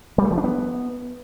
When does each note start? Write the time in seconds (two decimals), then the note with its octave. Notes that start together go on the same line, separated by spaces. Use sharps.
0.18 G3
0.25 A3
0.31 F3
0.38 D4
0.44 B3